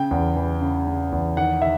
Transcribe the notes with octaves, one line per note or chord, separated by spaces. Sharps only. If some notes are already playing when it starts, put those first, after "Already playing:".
Already playing: C#3 G5
E2
E3
C#3
C#3
E2
D#3 F#5
D#3 E5